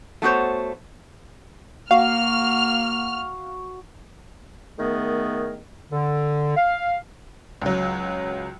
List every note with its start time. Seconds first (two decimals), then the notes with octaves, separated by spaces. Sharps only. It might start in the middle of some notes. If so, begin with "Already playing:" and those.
0.22 A3 B3 F#4 C5 C#5
1.91 A#3 F#4 F5 F6
4.79 D#3 A3 B3 G#4 A#4
5.92 D3
6.57 F5
7.62 C#2 F#3